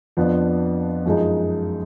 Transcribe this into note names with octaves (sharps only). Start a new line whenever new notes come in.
F2 F3 B3 D4
F#2 F3 G#3 D#4